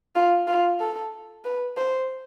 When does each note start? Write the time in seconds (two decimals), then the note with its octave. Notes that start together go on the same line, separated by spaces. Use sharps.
0.15 F4
0.48 F4
0.80 A4
1.45 B4
1.77 C5